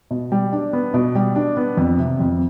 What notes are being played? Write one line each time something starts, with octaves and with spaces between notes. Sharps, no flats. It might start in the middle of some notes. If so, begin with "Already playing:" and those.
B2
G3
D4
B3
B2
G3
D4
B3
F2
C3
F2